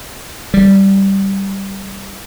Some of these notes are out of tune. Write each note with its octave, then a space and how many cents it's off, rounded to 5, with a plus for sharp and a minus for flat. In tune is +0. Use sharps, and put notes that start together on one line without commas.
G3 -10